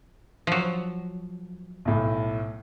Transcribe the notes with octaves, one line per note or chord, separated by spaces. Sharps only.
F3 F#3
B1 A2